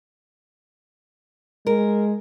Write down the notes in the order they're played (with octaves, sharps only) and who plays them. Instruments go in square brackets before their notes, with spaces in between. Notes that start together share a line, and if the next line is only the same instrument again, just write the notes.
[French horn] G#3 [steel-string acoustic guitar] A#4